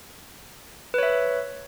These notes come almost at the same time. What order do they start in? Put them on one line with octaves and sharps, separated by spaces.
B4 C#5 E5